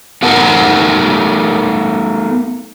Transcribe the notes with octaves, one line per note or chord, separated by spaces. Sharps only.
A3 B3 D#4 A#4 F#5 A5